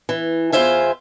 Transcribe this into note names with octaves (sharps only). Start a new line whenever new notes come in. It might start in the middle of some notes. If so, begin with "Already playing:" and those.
E3
E2 G2 F4 C5 E5 G#5